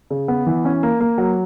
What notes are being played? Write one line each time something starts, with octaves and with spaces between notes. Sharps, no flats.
C#3
B3
E3
C#4
A#3
A#3
F#3